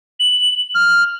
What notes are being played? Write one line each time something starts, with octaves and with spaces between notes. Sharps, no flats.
F#7
F6